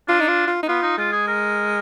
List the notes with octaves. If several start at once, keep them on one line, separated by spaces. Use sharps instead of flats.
D4 F4
D#4
F4
F4
D#4
B3 F4
D#4
G#3 F4
G#4
A#4